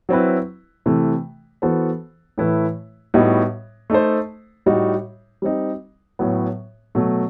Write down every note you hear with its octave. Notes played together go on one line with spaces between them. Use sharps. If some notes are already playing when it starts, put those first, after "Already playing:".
F#3 C4 E4 B4
C3 E3 A3
E3 B3 F#4 A4 C5
A2 E3 A3 E4 B4
A2 G3 B3 D#4 F#4
A3 D#4 A4 C5
A2 G3 D#4 F#4
G3 C4 D#4
A2 F#3 B3
B2 F#3 A3